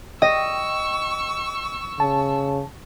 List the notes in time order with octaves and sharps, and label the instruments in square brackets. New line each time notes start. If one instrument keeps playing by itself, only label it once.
[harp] D#5 [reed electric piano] G5 [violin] C#6 E6
[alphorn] C#3 [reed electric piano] A5